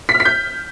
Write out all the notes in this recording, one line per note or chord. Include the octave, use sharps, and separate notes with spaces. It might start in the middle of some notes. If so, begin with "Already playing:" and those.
B6
F6
B6
G6